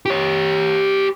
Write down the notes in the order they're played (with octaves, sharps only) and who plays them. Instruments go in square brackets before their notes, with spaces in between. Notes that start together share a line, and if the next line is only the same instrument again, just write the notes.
[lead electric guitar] G4 C#5